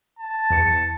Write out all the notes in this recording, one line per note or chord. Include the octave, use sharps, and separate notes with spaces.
A5
E2 C#7